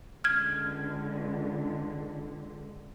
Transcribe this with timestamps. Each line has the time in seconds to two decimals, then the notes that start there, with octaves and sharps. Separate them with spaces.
0.24 C#2 D3 F6 G#6